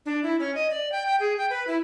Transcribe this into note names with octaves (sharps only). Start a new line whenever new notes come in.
D4
E4
C#4
D#5
D5
G5
G5
G#4
G5
B4
E4